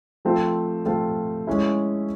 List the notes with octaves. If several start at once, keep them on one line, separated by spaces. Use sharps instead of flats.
F3 A3 C4 F4
F3 A3 C4 F4
G#3 C#4 E4